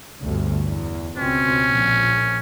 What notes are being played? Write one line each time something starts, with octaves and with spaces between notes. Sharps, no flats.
G1 D2
E2
C#2 B2 C4 C#4
A#1